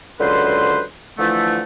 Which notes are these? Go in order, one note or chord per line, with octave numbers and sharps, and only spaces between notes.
C#2 D3 F#3 B4 C5 C6
D3 E3 F3 A3